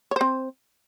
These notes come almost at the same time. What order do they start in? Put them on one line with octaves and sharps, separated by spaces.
C#5 C5 C4